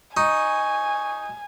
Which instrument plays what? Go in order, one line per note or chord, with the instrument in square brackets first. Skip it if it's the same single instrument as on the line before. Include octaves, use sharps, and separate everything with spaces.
[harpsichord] D#4 [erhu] G#5 [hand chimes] C#6